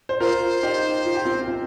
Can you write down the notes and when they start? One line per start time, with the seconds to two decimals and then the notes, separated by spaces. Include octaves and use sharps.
0.09 C5
0.20 F4 A#4 C5
0.63 D#4 G4
1.06 F4
1.15 G4
1.25 C4 F4
1.48 C4